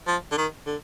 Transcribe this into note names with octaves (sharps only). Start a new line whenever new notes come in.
F3
D3
D#3
D3